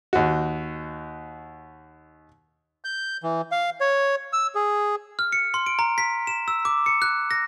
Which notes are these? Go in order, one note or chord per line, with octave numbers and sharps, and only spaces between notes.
D#2 F#4
G6
E3
F5
C#5
E6
G#4
F6
C#7
C6
D7
A#5
B6
E7
E6
D6
C#7
F#6
A#6